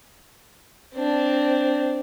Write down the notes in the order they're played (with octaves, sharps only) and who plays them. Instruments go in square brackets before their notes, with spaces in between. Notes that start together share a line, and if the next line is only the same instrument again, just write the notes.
[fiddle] C4 D4